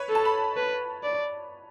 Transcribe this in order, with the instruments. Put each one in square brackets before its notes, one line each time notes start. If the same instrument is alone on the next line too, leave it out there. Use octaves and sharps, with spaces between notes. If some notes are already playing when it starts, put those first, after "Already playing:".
Already playing: [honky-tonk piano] B4 C#5
[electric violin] A4
[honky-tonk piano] A5
B5
[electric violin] B4
D5